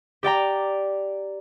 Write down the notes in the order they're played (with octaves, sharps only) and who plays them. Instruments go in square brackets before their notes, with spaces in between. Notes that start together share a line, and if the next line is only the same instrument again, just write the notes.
[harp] G4 D5 G5 A#5